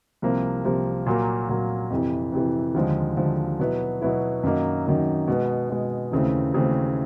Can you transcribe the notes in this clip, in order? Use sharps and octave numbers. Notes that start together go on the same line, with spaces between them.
C2 C3 F3 A#3
C2 C3 F3 A#3
A#2 F#3 A#3
A#2 F#3 A#3
F2 C3 E3
F2 C3 E3
D#2 D3 F3 G#3
D#2 D3 F3 G#3
B2 F#3 B3 E4
B2 F#3 B3 E4
F#2 D#3 F#3 A#3 D#4
F#2 D#3 F#3 A#3 D#4
B2 G#3 B3
B2 G#3 B3
D#2 C#3 E3 A3 C4
D#2 C#3 E3 A3 C4